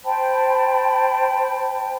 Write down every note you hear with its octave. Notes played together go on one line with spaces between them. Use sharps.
C5 G5 A5 B5